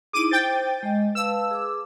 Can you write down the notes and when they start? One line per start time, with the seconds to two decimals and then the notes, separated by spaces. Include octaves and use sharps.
0.13 D#4 E4 G#4 D6 D#7
0.31 C5 G5 G6 A6
0.83 G#3 D#5
1.15 B4 F5 A5 E6
1.51 G#4 D6